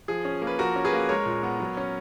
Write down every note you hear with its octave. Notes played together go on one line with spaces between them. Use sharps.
F3 G#4
C#4
A#3
B4
F3 F#4 A#4
C#4
G#4 B4
A#3
G#3 A#4 C#5
A#2
B3
F#3
C#4